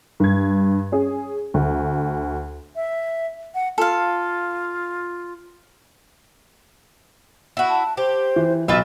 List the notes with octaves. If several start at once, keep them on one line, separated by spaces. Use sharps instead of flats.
G2 G#6
C#4 G#4
D2
E5
F#5
F4 A4 F5
E4 F#4
A5
G4 C5
E3
B1 F4 B4 D#5 E5 A6